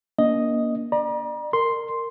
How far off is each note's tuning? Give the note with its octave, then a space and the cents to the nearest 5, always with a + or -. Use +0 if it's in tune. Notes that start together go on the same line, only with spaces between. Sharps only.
A#3 +20 D4 -40 D#5 +0
D5 +40 A#5 +40
A#4 -15 C6 +0